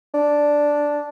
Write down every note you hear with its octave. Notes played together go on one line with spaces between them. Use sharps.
D4